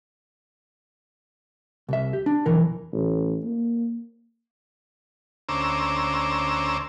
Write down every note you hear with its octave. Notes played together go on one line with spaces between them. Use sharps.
C2 E5
G4
D4
B1 F2 E3 A#4
A1
A#3
D2 C#4 C5 A#5 D6 E6